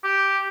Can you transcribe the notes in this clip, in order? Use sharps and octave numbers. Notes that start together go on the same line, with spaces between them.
G4